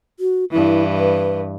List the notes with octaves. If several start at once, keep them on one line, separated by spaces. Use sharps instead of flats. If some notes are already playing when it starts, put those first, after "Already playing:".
F#4
G2 E3 E4
B4